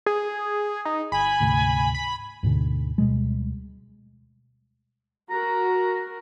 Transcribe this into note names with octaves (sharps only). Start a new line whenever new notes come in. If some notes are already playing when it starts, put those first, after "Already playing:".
G#4
D#4
G1 G#5 B5
D2 G#2 C3
B5
D2 G#2 B2 D3
D2 B2 G3 G#3
F#4 A#4 A#5